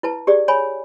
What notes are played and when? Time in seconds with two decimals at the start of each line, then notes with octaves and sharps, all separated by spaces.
0.03 E4 B4 A5
0.27 G4 G#4 D5
0.48 C#5 G#5 B5